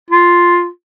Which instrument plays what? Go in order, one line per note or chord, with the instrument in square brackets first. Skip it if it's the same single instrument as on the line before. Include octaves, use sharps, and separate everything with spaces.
[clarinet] F4